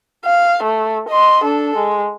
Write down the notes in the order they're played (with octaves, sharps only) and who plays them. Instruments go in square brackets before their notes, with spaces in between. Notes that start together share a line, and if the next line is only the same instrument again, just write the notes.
[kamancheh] F5
A3
D#5 C6
D4 A4
G#3